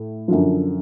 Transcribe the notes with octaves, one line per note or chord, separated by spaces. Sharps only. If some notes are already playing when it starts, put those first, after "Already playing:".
Already playing: A2
F#2 D3 F3